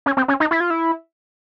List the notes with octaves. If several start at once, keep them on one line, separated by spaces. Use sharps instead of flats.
C#4
C4
C#4
D#4
E4
F4
E4